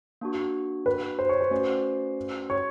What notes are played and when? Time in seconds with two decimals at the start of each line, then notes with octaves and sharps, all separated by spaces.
0.21 A#3 D4 F#4
0.86 B4
1.19 C5
1.29 C#5
1.41 C5
1.51 A3 C#4 F#4 B4 D5
2.50 C#5